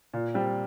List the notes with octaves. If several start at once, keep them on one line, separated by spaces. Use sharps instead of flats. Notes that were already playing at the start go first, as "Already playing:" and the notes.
A#2
G3 C4